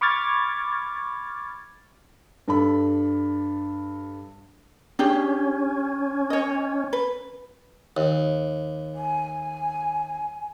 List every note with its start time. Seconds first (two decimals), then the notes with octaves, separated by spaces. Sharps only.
0.01 B5 C#6 D6 F6 G#6 A6
2.48 G2 D4 A4 B5
4.99 C#4 D4 G4 G#4
6.30 C#5 D#5
6.93 B4
7.97 D#2
8.94 G#5